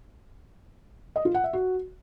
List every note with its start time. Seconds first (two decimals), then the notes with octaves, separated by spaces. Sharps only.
1.16 D#5
1.25 F4
1.34 F#5
1.44 E5
1.53 F#4